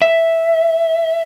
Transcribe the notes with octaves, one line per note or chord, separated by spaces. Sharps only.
E5